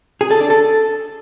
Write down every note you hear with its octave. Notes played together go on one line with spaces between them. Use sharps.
G#4
A4
D4
A4